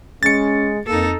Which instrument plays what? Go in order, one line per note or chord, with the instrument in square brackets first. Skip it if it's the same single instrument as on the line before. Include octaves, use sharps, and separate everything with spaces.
[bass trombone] G#3 [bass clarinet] C#4 [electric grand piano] A6 C#7
[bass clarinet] F2 [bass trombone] A#3 [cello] D#4 A4